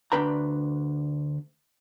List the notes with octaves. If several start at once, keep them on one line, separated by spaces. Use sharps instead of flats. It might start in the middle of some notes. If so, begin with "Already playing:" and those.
D2 D4 B4 G5 A#5